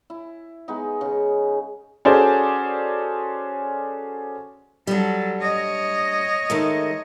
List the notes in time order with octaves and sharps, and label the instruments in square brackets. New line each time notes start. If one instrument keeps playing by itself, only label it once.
[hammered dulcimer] E4
G#3 B3 D#4
C#3
[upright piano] C#4 F#4 G#4 A4 C5 D5
[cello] F#3 A4 [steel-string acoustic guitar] G3 D4
[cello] C#5 D#5
[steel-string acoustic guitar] D#3 G#3 A3